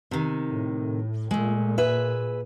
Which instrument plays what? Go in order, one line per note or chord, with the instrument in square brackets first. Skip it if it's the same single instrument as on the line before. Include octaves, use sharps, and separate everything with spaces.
[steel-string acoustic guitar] C3 D#3
[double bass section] A2
[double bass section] A#2 [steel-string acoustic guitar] G#3 A3
[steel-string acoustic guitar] G#4 B4 E5